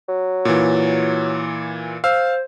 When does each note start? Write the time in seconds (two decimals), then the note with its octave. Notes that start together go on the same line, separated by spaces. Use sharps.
0.09 F#3
0.45 A#2 E3
2.04 C5 F5 E6